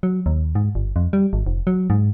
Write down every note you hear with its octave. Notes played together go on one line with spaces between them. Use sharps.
F#3
D#2
G#2
G1
F2
G3
G#1
F1
F#3
G#2